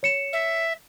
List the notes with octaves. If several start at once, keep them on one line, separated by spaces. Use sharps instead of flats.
C#5 C#7 E7
E5